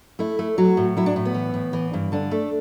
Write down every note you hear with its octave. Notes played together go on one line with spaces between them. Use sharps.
A3 E4
A3
F#3 F#4
A2
F#3 E4
D4
A2
B3
E3
A2
E3
G2
D3 D4
A3